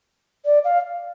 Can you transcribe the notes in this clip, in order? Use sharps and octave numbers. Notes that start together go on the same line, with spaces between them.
D5
F5